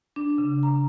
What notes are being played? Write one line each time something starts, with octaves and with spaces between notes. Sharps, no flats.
D4
C#3
A#5